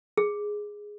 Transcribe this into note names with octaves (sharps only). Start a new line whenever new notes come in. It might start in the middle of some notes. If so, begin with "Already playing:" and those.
G#4